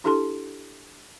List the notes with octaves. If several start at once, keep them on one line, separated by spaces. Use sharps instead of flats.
D4 E4 G4 A4 A5 C6